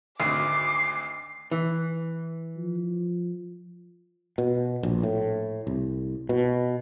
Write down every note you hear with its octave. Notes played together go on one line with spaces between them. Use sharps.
G#1 D2 D6 C7
E3
F3
B2
A#1
A2
C2
B2